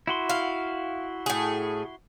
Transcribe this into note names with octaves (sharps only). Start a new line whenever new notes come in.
E4 F#4 C6
F5
A2 G#4